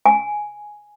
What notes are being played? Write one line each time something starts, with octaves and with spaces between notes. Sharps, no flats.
G#5